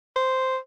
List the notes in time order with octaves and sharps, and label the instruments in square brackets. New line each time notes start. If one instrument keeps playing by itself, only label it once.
[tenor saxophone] C5